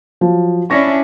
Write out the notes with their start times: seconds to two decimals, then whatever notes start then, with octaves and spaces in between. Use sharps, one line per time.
0.21 F3 F#3
0.70 C#4 D4 E4 C#6 A#6